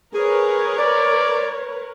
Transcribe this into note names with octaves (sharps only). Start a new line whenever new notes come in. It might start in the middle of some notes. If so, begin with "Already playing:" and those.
G#4 A#4 B4 C#5
D5